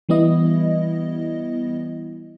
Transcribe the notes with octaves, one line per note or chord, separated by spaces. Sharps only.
E3 G3 B3 E4 D#5